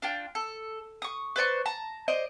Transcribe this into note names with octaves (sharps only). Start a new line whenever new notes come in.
D4 F4 G5
A4
C#6 D#6
B4 C5 D5 C#6
A5 A#5
C5 D5 D#5